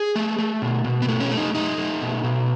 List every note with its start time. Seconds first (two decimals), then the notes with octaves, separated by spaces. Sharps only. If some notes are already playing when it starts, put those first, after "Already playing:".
Already playing: G#4
0.15 A3
0.39 A3
0.62 B2
0.85 B2
1.02 B3
1.09 A3
1.20 C#4
1.31 A3
1.37 D#4
1.55 A3 D#4
1.77 A3
2.01 B2
2.23 B2